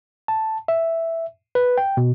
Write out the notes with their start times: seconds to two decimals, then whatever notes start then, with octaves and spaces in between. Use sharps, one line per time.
0.28 A5
0.68 E5
1.55 B4
1.78 G5
1.97 B2